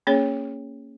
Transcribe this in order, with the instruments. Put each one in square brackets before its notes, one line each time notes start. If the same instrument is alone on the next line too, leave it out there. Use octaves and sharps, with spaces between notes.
[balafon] A#3 C#4 G#4 C#5